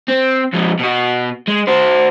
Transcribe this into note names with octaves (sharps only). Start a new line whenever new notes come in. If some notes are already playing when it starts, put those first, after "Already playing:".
C4
F2 G#3
B2 F#4
G#3
F#4 C5